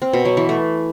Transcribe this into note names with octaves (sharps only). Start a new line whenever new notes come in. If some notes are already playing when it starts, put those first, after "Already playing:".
C4
B2
F#3
E3
A3